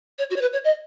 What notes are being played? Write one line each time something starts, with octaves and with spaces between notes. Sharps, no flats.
C#5
F#4
C#5
B4
C#5
D#5